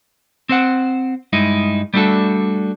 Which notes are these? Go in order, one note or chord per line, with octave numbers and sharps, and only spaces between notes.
C4 C5 F#5
G2 G#3 D#4 E4
G3 A3 D4 F#4 A4